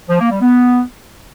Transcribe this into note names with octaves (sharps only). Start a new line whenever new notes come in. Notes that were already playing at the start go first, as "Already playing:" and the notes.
F3
A#3
G3
B3